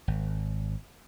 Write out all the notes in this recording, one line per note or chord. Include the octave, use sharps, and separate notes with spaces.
G#1